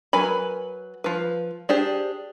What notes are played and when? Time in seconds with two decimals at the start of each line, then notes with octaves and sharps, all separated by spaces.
0.13 F#3 A#4 B4 G#5 B5
1.04 F3 B4
1.69 D4 G4 G#4 C5